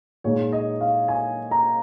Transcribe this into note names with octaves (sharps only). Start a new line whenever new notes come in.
A#2 G#3 D#4 C#5
D#5
F5
G#5
A#5